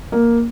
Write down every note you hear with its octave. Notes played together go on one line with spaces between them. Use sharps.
A#3